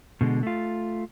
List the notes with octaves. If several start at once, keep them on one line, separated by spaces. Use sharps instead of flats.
B2 D3 G#3
A3 F4